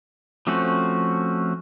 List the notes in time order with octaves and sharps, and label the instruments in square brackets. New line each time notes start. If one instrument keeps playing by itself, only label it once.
[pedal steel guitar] F3 A3 C4 C#4 F#4